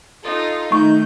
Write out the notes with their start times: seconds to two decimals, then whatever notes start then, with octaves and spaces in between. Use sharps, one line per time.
0.22 D#4 F4 A4
0.72 D#3 A3 D#4 C#6 G6